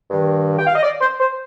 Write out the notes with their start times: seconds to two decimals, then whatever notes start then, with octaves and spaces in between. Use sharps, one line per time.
0.10 G2 D#3
0.58 G5
0.67 F5
0.75 D#5
0.83 D5
1.01 C5
1.20 C5